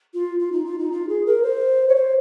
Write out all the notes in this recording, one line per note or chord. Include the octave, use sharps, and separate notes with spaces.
F4
F4
D#4
F4
D#4
F4
G#4
A#4
C5
C#5
C5